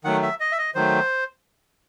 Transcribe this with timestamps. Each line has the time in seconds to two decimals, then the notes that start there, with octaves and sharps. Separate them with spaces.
0.04 D#3 F#3 A3 F#5
0.22 E5
0.40 D#5
0.52 E5
0.58 D#5
0.75 D#3 F#3 A3 C5